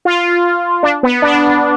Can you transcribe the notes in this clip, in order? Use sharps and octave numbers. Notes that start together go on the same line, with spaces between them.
F4
D4
B3
D4